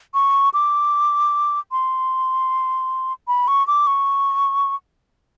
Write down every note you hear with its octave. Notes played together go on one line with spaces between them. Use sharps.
C#6
D6
C6
B5
C#6
D6
C#6